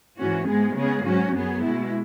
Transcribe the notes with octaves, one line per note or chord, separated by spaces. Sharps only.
G#2 E3 C#4 F#4
G#2 G#3 B3 G#4
C#3 G#3 B3 G#4
G#2 F#3 C#4 F#4
F#2 F#3 B3 G#4
B2 G#3 E4